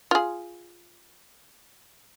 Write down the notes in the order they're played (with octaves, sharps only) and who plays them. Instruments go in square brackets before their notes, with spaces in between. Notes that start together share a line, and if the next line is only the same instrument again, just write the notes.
[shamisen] F4 G#4